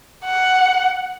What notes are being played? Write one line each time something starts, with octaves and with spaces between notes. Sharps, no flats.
F#5